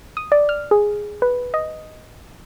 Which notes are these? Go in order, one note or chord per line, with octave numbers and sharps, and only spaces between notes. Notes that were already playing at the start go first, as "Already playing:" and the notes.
D#6
D5
F6
G#4
B4
D#5